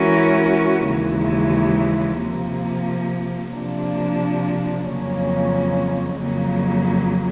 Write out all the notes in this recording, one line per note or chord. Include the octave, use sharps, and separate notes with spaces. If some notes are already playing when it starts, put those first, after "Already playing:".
Already playing: E3 G#3 C#4 F#4 A#4
D#2 C#3 E3 G#3
C3 F3 A#3
C3 F3 A#3 D4
F2 C#3 F#3 A#3 C#4
F2 C#3 F#3 A#3